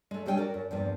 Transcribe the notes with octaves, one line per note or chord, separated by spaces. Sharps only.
G#3 A3
F#3 G3 D4 E5 G5 G#5
F#4 A#4 D5
F#2
E2 G2 A#2 F3